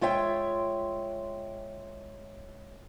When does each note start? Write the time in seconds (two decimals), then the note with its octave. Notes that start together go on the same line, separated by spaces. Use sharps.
0.01 G#3 F4 C#5 E5 G5